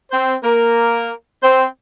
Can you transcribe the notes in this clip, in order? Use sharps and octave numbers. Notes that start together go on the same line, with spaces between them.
C4 C5
A#3 A#4
C4 C5